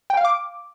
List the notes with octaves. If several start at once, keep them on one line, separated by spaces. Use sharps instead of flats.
G5
F5
D6